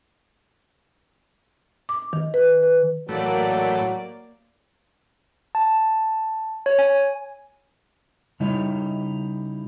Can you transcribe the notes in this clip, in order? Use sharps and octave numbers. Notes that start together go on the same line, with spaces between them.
D6
D#3
B4
B4
A2 E3 F#3 A3 A#3 D5
A5
C#5
G#5
C#3 G3 D#4 E4 C#5